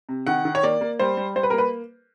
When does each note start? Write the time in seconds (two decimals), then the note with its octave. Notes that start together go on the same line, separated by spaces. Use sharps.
0.09 C3
0.27 D#3 F#5
0.45 D#3
0.55 C#5
0.63 A#3 D5
0.81 A#3
0.99 G3 C5
1.17 G3
1.36 G3 C5
1.43 B4
1.50 A#4
1.53 A#3
1.58 B4